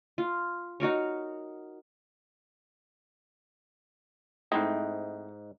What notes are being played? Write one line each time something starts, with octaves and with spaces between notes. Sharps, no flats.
F4
D#4 F#4 A#4 C#5
G#2 A3 C4 D#4 E4 D#5